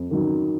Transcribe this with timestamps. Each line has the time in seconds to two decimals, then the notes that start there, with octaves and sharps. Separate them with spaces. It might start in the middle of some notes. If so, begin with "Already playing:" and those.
Already playing: F2
0.11 D#3 F#3